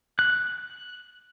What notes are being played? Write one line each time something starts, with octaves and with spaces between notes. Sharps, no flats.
F#6